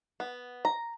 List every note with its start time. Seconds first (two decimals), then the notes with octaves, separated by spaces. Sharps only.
0.20 B3
0.65 A#5